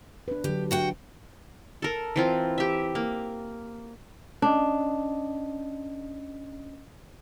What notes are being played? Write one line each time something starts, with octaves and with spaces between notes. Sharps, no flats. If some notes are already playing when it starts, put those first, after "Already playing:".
D4 B4
D3 F#3 G4
F#4 F#5 G5
A4 A#4
E3 C4 F4
G4 E5
A#3
C#4 D4 D#5